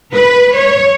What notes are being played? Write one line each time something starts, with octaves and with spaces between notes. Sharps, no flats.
B4
C#5